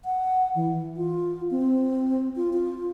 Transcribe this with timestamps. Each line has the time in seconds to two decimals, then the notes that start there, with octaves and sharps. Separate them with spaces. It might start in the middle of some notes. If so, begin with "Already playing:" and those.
0.05 F#5
0.56 E3
0.97 F4
1.51 C4
2.36 F4
2.53 F4